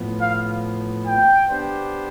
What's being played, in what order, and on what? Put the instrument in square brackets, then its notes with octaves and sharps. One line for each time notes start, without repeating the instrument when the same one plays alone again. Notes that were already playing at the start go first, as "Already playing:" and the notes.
Already playing: [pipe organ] A2 F3 B3
[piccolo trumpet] F5
G5
[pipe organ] B3 D4 G4 C5